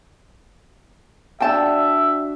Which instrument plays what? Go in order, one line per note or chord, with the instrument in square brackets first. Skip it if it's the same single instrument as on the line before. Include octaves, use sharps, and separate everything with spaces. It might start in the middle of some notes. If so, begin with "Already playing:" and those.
[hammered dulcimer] D4 F#4 [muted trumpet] E5 [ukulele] G5 A5